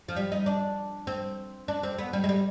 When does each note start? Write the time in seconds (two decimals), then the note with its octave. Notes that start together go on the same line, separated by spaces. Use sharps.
0.08 F3
0.16 G3
0.32 D#4
0.46 D4
1.07 C4
1.68 D4
1.83 C4
1.98 B3
2.13 G3
2.24 G#3
2.29 G3